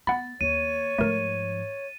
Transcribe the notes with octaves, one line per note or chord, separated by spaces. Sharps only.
B3 F#5 B5 A6
D#2 C#5 D#7
G#2 F3 A3 A#4